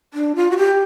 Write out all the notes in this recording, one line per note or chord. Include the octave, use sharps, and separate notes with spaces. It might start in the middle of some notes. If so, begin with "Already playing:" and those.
D4
F4
F#4
G4